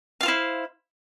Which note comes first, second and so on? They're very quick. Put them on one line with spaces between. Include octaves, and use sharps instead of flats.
F5 F4 C5 E4